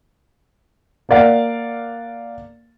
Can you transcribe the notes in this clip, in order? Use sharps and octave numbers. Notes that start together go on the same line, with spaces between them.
A#3 A#4 D5 F5 F#5